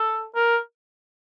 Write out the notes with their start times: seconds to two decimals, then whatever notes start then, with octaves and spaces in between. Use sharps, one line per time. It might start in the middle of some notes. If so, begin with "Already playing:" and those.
Already playing: A4
0.35 A#4